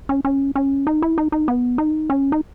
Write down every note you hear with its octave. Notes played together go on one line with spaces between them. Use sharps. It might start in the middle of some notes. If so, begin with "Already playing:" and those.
C#4
C#4
C#4
D#4
E4
D#4
D#4
B3
D#4
C#4
D#4